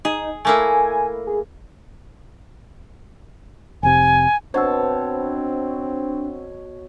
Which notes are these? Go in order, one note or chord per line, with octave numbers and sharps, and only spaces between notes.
D#4 G#4
A3 A#3 E4 G#5
G#4
F1 C3 G#5
B2 C4 D4 C5 C#5 F#5 A5 E6